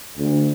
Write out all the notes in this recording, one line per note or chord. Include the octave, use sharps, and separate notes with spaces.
D2